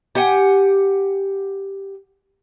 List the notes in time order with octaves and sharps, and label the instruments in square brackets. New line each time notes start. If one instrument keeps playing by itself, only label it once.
[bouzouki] G4 F#5 G#5